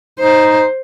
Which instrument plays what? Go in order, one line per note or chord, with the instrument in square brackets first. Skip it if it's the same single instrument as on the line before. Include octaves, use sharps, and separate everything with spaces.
[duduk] D#4 [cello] C5